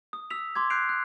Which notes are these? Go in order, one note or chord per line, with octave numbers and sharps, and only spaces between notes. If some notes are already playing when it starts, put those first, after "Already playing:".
D#6
D#6 E6 B6 F7
C6 D6 G#6
F#6 G6 C7 D7 F7
F#6